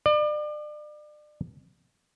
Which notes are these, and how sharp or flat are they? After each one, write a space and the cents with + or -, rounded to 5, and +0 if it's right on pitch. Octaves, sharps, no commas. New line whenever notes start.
D5 +35